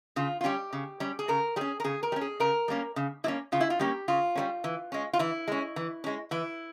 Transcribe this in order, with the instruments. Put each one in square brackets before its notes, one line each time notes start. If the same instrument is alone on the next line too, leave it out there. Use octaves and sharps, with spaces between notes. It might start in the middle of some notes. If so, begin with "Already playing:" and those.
[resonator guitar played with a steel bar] C#3 F4
F4
G3 C#4 G4
C#3
G3 C#4
G#4
C#3 A#4
G3 C#4 G#4
A#4
C#3 G#4
A#4
G3
C#4
G#4
C#3 A#4
G3 A#3 C#4
C#3
G3 A#3 C#4 E4
C#3 F4
E4
F4
G3 A#3 C#4 G4
C#3 F4
G3 A#3 C#4
E3
G#3 C#4
F4
E3 E4
G#3 C#4
E3
G#3 C#4
E3 E4